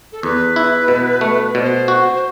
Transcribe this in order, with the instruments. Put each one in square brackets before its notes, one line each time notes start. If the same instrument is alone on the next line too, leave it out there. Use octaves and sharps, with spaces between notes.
[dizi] A4
[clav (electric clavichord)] E2 [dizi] B4
[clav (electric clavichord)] E4
B2
A3
[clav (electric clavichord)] B2 [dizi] C5 D5
[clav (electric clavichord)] F#4